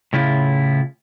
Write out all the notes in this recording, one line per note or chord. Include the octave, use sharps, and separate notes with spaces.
A2 C#3 E4 F4